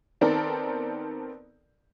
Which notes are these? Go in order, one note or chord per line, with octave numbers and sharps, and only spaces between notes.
D#3 B3 C4 A4 A#4 D5